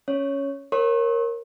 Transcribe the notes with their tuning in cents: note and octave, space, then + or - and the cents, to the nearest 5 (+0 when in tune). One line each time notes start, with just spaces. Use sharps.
C#4 +0 C#5 +0
A#4 +0 C#5 -30 C#6 -45